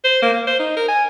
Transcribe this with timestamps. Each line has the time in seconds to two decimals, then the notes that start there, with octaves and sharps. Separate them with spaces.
0.04 C5
0.22 A#3
0.34 A#3
0.47 C5
0.59 D#4
0.77 A#4
0.88 G#5